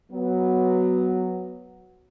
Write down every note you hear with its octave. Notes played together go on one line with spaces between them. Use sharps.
F#3 B3